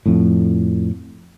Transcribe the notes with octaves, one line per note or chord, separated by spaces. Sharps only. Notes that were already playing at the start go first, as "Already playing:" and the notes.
F2 A2